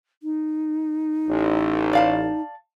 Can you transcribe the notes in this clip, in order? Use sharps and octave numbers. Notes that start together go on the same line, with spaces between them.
D#4
A1
D5 F5 A5